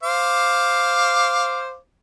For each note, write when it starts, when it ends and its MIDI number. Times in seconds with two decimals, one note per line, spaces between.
0.03 1.76 72
0.03 1.76 77
0.03 1.76 86